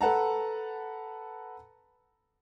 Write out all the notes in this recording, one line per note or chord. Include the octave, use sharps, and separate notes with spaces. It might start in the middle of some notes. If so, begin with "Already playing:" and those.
A4 B4 F#5 A5 A#5